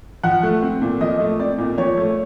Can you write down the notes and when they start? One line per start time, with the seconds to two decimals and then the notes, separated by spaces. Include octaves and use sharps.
0.23 F3 F#5
0.43 A3
0.62 C4
0.82 A#2
1.01 F3 D#5
1.20 A3
1.39 C4 D5
1.58 A#2
1.78 F3 C#5
1.97 A3